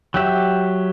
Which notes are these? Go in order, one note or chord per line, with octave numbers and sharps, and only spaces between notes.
F#3 G4 E5